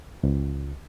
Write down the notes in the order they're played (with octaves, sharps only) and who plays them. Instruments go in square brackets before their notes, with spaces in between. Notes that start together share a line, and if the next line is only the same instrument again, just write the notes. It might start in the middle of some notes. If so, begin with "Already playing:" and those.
[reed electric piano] C#2